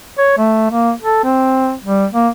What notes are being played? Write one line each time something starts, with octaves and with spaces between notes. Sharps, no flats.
C#5
A3
A#3
A4
C4
G3
A#3